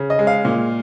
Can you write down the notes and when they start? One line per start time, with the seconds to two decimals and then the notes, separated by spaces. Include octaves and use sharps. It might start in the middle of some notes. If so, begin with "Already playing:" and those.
Already playing: C#3
0.10 D#5
0.19 G#3
0.27 F5
0.45 A#2